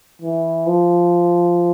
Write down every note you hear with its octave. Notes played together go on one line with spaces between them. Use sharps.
E3
F3